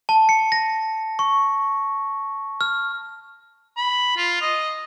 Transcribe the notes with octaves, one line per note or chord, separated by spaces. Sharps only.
A5
C#7
A#6
C#6
F6
B5
F4
D#5